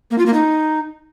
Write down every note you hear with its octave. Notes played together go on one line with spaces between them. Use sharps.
A#3
F4
A#3
D#4